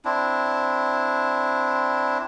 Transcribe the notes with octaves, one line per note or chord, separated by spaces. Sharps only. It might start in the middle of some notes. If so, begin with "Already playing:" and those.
C4 D4 E4